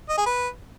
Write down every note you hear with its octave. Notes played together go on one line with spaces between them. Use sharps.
D#5
G#4
B4